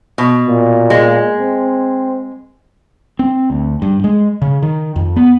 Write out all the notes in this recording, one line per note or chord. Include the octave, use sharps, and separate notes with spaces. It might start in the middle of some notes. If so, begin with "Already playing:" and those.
B2
A#2
G#3
C4
C4
D2
G2
G#3
C#3
D#3
F2
B3